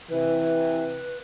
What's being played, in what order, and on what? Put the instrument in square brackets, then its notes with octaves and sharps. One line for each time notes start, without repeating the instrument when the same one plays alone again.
[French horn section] C3 E3 [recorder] B4